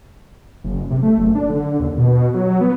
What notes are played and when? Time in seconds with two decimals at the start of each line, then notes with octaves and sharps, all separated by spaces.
0.64 F#1
0.90 C3
1.03 A3
1.18 F#1
1.35 D4
1.49 D3
1.80 D#2
1.97 B2
2.34 F#3
2.61 B3